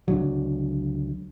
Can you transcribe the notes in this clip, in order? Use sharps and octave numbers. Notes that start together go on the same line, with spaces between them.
C#2 D3 F#3